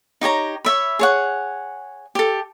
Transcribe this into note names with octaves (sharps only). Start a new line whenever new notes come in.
D#4 G4 C#5 A#5
C#5 E5 B5
G#4 C#5 F#5
G4 A4